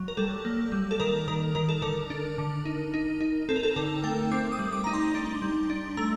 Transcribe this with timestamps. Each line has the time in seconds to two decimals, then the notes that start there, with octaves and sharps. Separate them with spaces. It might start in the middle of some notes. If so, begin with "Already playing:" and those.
Already playing: F#3
0.08 A#4
0.17 G3 A4
0.45 A#3
0.72 G3
0.91 A4
1.00 D#3 A#4
1.28 D#3 A#4
1.55 D#3 A#4
1.69 A4
1.82 D3 A#4
2.10 D4
2.38 D3
2.65 D#4
2.94 D#4
3.21 D#4
3.49 C4 A4
3.56 A#4
3.63 A4
3.76 D3 A#4
4.04 A3 G5
4.32 C4 D6
4.52 D#6
4.59 G3
4.72 D6
4.84 D#4 A#5
4.93 C6
5.15 D4
5.42 G3
5.70 D4
5.97 A3 A#5